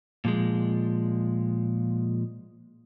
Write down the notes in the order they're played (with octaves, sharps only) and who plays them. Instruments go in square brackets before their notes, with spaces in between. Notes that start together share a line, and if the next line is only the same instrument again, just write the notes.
[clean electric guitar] A#2 F3 G#3